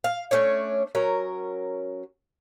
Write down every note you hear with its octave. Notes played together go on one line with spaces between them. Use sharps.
F5
A3 C#4 D4 C#5
F#3 C#4 A#4